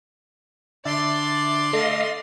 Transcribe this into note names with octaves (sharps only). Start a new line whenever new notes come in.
D3 D4 D5 E5 A5 C6
A3 A4 D#5 F5